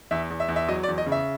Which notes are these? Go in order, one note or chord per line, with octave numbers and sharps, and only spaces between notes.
E2 E5
E2
E5
E2
E5
F#3 D#5
D5
E2
D#5
C#3
E5